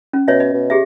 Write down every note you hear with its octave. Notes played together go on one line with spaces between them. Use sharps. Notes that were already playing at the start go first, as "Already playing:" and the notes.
C#4
B2 C#5 D#5 E5
D#5
B2
G4 G#4 E5